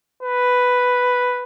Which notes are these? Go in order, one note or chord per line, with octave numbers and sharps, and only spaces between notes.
B4